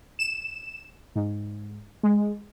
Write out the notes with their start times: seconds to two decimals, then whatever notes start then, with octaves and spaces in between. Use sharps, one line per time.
0.19 E7
1.15 G#2
2.03 G#3